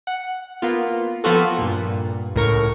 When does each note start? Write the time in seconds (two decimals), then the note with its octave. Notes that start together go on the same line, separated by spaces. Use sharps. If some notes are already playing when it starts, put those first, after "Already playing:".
0.07 F#5
0.62 A#3 B3 F4
1.24 F3 B3 C4 F4 F#4 A4
1.58 G2 A#2
2.35 C#2 A2 A#4 C#6